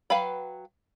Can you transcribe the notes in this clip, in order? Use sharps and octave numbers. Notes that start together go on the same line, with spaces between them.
F#3 B4 F5 G5 B5